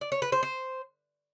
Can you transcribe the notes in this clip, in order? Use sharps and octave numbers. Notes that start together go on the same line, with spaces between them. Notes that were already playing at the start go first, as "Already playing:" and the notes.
D5
C#5
B4
C5
C5